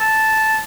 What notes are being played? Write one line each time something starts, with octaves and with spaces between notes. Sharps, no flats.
A5